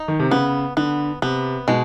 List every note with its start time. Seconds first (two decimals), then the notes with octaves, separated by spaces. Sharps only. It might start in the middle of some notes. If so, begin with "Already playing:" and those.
Already playing: D#4
0.08 D#3
0.19 C3
0.31 C#3 B3
0.77 D3 B3
1.22 C3 B3
1.68 B2 G#3